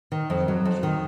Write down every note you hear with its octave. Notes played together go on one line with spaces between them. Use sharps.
D#3
F2
F#3
F2
D#3